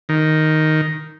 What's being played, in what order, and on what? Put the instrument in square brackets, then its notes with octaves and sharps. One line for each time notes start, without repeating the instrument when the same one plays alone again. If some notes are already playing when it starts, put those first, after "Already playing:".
[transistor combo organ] D#3